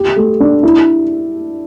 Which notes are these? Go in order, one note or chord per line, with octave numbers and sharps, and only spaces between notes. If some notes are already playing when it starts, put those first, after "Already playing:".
Already playing: G4
A3
D4
E4